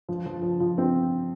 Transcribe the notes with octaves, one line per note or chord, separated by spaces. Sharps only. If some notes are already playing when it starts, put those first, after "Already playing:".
F3
F3
F3
F3
C4